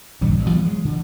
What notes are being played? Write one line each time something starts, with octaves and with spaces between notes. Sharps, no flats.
A#1 G2 D#3 F#3
A1 A2
E3 G3 B3
F#3 G#3
D3 E3